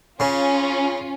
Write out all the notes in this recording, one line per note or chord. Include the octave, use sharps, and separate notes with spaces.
C#3 C#4 F4